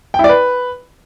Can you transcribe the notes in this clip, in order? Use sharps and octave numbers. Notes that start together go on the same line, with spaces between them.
G5
E4
D5
B4